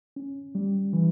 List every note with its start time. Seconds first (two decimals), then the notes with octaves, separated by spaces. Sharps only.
0.16 C#4
0.55 G3
0.93 E3